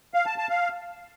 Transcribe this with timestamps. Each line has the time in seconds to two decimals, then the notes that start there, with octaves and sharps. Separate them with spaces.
0.14 F5
0.26 A5
0.38 A5
0.50 F5